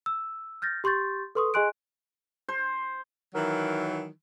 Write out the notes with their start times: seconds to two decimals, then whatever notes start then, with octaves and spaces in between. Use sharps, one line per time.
0.06 E6
0.62 F6 G6 A6 A#6
0.84 G4 C6 C#6 G6 A6
1.35 A4 B4 C6 C#6 D#6
1.54 G#4 D#5 G#5 C6 F#6 D7
2.49 C5
3.35 D#3 E3 F#3 A#4